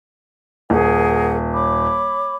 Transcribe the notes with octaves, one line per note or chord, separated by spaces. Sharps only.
D#1 G#4 A#4 F#5
C#5 B5 D6